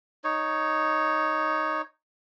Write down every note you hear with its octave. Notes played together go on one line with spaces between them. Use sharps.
D#4 C#5